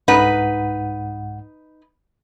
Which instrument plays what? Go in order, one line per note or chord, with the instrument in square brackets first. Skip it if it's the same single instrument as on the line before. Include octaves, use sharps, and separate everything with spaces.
[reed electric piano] C2 G#2 F#5 [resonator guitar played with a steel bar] D#4 B4